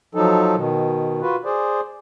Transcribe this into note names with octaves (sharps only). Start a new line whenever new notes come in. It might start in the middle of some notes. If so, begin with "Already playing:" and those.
F3 F#3 D#4 A4
B2 D#3
F4 F#4 B4
G#4 C5 D5